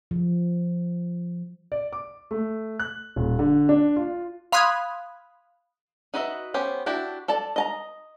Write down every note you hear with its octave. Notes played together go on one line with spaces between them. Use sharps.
F3
D5
D6
A3
F#6
D#1
D3
D4
F4
F5 B5 C6 D#6 F#6 G#6
D#4 F#4 B4 D#5 E5
B3 C#4 G4 C5
D4 E4 F#4 G4
A4 D5 A5
D#5 A5 A#5